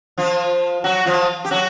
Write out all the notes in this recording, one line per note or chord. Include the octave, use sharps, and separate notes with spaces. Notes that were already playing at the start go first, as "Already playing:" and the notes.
F3 F4
F#3 F#4
F3 F4
G4
F#3 F#4